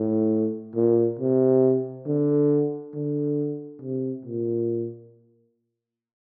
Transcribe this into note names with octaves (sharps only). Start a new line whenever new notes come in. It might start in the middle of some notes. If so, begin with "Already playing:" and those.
Already playing: A2
A#2
C3
D3
D3
C3
A#2